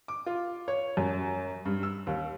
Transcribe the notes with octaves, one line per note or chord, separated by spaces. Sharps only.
D6
F4
C#5
F#2
G2
E6
D#2